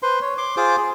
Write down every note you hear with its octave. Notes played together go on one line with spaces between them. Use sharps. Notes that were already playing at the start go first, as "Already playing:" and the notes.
B4 C5 C6
C#5
C6 D6
F4 G#4 C5 D6
G#4